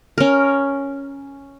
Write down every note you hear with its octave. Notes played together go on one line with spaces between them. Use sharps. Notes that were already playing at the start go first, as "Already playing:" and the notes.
C#4 A#4